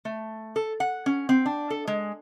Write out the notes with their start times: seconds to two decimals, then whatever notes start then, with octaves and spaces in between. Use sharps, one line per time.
0.05 A3
0.56 A4
0.80 F#5
1.06 C#4
1.29 C4
1.46 D4
1.70 A4
1.87 G#3